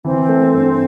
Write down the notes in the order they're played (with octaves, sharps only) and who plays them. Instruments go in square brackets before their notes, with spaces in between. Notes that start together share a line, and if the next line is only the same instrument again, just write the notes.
[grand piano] E3 [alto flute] C4
[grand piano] A3
G2